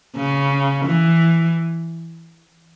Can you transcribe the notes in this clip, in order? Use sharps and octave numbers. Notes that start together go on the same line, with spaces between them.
C#3
E3